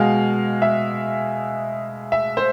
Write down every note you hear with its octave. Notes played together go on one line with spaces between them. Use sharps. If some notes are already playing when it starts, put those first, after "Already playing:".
Already playing: B2 G#3 F5
E5
E5
C5